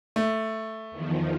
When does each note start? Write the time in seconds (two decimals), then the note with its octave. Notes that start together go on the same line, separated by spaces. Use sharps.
0.16 A3
0.91 E2 D#3 F3